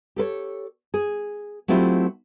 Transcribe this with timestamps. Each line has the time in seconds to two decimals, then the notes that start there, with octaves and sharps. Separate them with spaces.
0.16 G4 A4 B4 C#5
0.94 G#4
1.68 F#3 A3 C4 E4 F4 G4